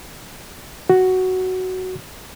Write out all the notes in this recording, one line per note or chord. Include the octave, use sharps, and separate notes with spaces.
F#4